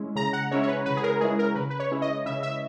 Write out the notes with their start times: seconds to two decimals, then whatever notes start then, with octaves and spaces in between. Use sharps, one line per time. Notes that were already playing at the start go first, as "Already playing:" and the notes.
Already playing: G#3 C#4 E4
0.15 C#3 A#5
0.33 F#5
0.51 G#3 C#4 E4 C#5
0.63 C#5
0.68 B4
0.86 C#3 B4
0.97 G#4
1.03 A#4
1.21 G#3 C#4 E4 G#4
1.39 A#4
1.55 C#3 B4
1.70 B4
1.80 C#5
1.91 G#3 C#4 E4
2.02 D#5
2.26 C#3 E5
2.43 E5